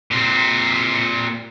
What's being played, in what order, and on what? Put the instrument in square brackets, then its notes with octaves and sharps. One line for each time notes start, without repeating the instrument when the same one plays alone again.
[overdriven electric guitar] A#2 C4